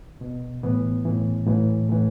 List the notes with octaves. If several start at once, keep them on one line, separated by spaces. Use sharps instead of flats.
B2
A2 E3 B3
A2 E3
A2 E3
A2 E3